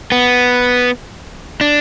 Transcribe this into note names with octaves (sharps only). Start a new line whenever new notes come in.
B3
D4